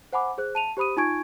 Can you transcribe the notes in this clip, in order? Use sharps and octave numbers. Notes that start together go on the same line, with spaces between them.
C5 F#5 G#5 B5 D6
G#4 C5 F#6
A5 D#7 F7
G4 C5 B5 D#6 D#7
D#4 F4 G#5 C#6 G#6 D7